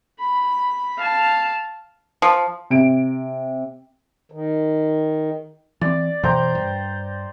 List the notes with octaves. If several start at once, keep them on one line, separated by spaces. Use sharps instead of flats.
B5
F5 A5
F3
C3 D7
D#3
E3 C4 D5
F#2 B2 E3 C5 G5 A#5
G2